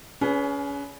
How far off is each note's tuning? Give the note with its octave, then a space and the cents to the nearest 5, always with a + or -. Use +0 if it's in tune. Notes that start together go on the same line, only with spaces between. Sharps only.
C#4 +30 G#4 +5 B4 +0